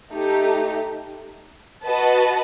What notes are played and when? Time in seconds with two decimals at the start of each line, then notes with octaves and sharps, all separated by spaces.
0.12 A3 D#4 G4
1.84 F#4 B4 D#5 A5